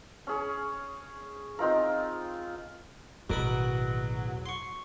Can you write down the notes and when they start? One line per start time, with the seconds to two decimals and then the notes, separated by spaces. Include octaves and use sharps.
0.27 C#4 G#4 C#5
1.59 C4 D#4 F4 A#4
3.30 A1 E2 B2 D#3 F#3 A#4 B5
4.46 C6 C#6